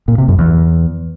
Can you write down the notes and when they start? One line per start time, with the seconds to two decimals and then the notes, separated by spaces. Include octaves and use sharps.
0.08 A#2
0.18 C3
0.28 F#2
0.39 E2